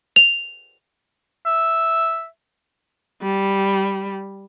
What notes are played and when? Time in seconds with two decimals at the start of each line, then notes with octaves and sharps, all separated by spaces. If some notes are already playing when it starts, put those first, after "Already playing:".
0.16 F7
1.46 E5
3.22 G3